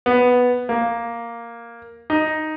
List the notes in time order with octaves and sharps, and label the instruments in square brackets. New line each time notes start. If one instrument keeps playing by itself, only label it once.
[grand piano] B3
A#3
D#4